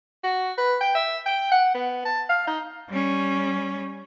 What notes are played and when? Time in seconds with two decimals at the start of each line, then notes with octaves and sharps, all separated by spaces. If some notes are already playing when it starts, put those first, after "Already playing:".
0.23 F#4
0.58 B4
0.80 G5
0.95 E5
1.26 G5
1.52 F#5
1.74 B3
2.05 A5
2.29 F5
2.47 D#4
2.89 G3 C#4